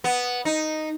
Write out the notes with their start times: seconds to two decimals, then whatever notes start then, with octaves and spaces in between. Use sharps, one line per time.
0.04 B3
0.45 D#4